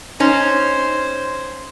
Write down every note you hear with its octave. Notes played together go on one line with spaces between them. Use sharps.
C#4 D#4 C5